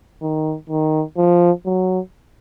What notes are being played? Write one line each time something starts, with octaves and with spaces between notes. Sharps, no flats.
D#3
D#3
F3
F#3